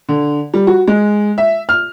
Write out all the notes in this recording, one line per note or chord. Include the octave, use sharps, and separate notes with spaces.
D3
G3
F#4
G#3
E5
F6